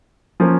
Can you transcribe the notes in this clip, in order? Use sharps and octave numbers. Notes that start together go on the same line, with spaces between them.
F3 A#3 C#4